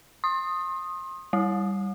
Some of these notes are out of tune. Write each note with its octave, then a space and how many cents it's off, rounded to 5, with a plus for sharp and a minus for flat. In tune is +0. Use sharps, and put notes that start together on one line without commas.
C6 +35 D#6 +0
G3 +0 E4 +0